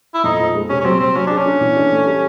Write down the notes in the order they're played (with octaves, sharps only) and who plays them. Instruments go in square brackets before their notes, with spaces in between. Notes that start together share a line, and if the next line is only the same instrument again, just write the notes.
[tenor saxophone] E4
[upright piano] F2 [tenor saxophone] D#4
[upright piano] F3
G#3
[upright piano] C3 [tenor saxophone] C#4
[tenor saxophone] C#4
[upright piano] F#3 [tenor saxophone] C4
[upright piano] F#3 [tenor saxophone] C4
[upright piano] F#3 [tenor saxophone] C#4
[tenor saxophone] D4 [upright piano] G#4
[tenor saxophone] C#4
[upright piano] D4
E3
D4
A3
G3